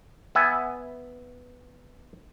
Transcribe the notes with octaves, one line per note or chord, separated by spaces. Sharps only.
B3 E5 G#5